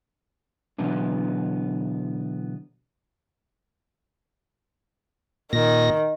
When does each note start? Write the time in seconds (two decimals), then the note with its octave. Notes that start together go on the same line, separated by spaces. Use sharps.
0.78 B2 D3 E3 F#3 B3 D4
5.53 A#2 D#3 A#6